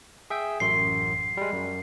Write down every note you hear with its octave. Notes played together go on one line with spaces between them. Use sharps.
G#4 E5 G5
A1 F#2 C6 C7
G3 G#3
F#2